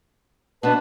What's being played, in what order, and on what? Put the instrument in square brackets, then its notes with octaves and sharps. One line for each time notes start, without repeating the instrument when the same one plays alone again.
[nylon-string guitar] B2 B3 [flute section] D4 B4 A5